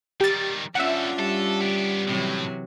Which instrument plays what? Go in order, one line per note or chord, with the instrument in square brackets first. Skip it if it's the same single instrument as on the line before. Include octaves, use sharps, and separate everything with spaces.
[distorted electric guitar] D#3 G3 [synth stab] G4 A6
[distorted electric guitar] G3 A4 [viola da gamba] C#4 D4 F4 [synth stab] E5 F#5
[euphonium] G3 [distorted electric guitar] A4
[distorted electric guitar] B3 G4
[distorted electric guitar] A2 [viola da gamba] C3 E3 F#3